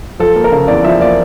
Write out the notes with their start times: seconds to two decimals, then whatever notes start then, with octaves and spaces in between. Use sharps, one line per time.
0.19 F3 A4
0.36 A#3
0.44 A#4
0.52 C#3
0.68 E2 D5
0.84 F3 E5
1.00 A#3 D5